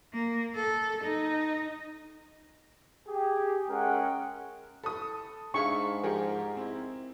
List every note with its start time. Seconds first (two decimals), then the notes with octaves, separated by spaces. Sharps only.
0.13 A#3
0.55 A4
1.04 D#4
3.07 G4 G#4
3.68 G#3 C#4 G#4 A#4 F#5 G5
4.84 A4 B5 D#6
5.54 G#2 D4 D#4 G#4 E5 F5 C#6
6.04 F3 G4 G#4 A#4
6.57 C4 E4